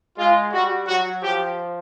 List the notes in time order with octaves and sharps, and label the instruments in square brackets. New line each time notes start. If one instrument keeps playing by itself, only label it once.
[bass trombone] G#3 [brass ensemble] F4
[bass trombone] G3 [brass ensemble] F#4
[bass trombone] F#3 [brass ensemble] F#4
[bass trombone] F3 [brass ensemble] G4